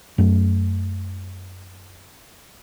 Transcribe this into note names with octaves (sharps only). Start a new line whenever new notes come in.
F#2 A3